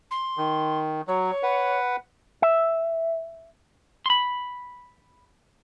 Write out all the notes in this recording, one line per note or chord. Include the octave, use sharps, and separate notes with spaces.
C6
D#3
F#3 C#5
B4 F#5
E5
B5 C6